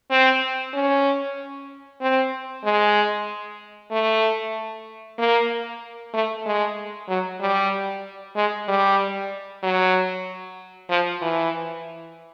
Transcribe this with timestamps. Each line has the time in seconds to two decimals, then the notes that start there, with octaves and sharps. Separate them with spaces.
0.11 C4
0.74 C#4
2.01 C4
2.64 G#3
3.91 A3
5.19 A#3
6.14 A3
6.46 G#3
7.09 F#3
7.41 G3
8.36 G#3
8.68 G3
9.63 F#3
10.90 F3
11.22 E3